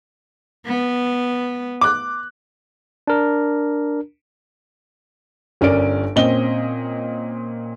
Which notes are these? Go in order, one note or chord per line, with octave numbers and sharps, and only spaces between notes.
B3
D6 F#6
D4 A#4
G1 C#4 A#4 D5 D7
A#2 C4 C#4 D#5 G7